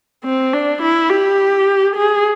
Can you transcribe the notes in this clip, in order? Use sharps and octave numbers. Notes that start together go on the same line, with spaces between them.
C4
D4
E4
G4
G#4